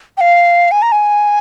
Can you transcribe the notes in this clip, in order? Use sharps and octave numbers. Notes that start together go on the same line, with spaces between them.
G5
F5
G#5
A#5
G#5